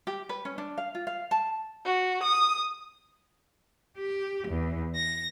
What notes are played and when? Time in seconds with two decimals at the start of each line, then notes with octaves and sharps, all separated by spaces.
0.07 G4
0.29 B4
0.45 C#4
0.58 D4
0.78 F5
0.95 F4
1.07 F5
1.31 A5
1.86 F#4
2.23 D#6
3.96 G4
4.47 E2
4.96 A#6